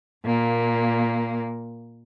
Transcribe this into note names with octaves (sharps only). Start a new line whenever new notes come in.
A#2 A#3